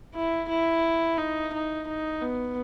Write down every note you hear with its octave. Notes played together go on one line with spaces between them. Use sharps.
E4
E4
D#4
D#4
D#4
B3